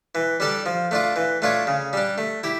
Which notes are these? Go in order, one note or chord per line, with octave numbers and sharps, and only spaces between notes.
E3
G3 D4 A4 D5
F3
A3 D4 F4
E3
A3 D4 F4 C#5
C#3
G3 D4
A3
E4 G4